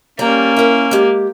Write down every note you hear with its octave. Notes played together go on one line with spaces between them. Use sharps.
G3 A#3 C#4 D5 A#5
E4 A#4
G#3 G4